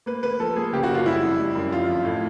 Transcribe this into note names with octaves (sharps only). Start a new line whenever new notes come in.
A#3 B4
A#3 B4
F3 A4
A#3 G#4
C#3 G4
F#4
F#2 F4
G3 E4
F2
G3
F#2
F3 F4
F2
A2